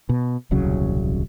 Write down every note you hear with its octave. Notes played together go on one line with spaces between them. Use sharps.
B2
D#1 C2 C#3 F#3